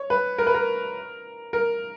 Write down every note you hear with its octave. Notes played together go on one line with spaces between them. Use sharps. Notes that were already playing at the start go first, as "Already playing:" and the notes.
Already playing: C#5
B4
A#4
B4
A#4
A#4